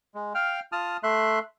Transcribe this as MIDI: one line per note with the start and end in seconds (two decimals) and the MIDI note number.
0.15 0.33 56
0.35 0.60 77
0.35 0.60 79
0.35 0.60 89
0.72 0.97 65
0.72 0.97 81
0.72 0.97 87
0.72 0.97 89
1.03 1.39 57
1.03 1.39 76
1.03 1.39 84
1.03 1.39 90